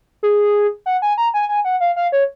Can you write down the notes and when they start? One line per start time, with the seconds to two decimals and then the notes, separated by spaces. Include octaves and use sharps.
0.23 G#4
0.86 F#5
1.02 G#5
1.18 A#5
1.34 G#5
1.49 G#5
1.65 F#5
1.80 F5
1.96 F5
2.12 C#5